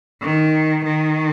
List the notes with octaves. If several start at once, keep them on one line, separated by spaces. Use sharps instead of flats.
D#3
D#3